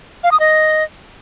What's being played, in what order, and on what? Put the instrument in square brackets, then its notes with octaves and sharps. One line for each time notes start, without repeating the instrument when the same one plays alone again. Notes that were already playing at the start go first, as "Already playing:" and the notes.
[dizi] F5
D#6
D#5